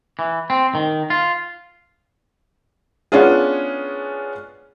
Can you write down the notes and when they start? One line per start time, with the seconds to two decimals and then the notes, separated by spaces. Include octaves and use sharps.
0.19 E3
0.50 C4
0.75 D#3
1.10 F4
3.12 B3 C#4 D4 F4 G#4